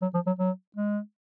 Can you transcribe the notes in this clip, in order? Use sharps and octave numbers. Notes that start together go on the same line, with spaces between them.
F#3
F3
F#3
F#3
G#3